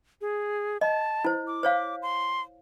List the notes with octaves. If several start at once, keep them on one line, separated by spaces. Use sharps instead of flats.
G#4
D#5 A5
E4 C5
D6
C5 C#5 F5
C6